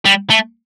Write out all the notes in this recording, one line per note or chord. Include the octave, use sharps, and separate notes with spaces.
G3
A3